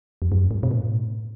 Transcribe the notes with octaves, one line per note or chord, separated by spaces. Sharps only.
F2
F#2
G#2
B2
A2